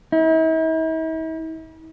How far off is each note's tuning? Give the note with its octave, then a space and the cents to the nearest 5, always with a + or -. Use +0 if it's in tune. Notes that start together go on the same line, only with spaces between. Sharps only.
E4 -45